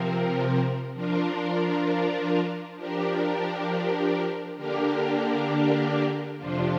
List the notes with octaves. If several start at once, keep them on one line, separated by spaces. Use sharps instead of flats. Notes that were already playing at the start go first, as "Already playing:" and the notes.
Already playing: C3 F3 C4 A#4
F3 D4 F4 A#4
F3 D4 G4 A#4
D3 A#3 D4 G4 A#4
F2 C3 F3 D4 F4